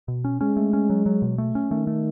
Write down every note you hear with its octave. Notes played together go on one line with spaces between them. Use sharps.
B2
C#4
G#3 C#4
A3
C#4
F#3
F#3
B2
A3
C#4
D#3 A3
A3